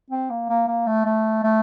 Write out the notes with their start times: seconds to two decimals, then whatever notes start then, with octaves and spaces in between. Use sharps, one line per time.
0.10 C4
0.30 A#3
0.49 A#3
0.68 A#3
0.86 A3
1.05 A3
1.44 A3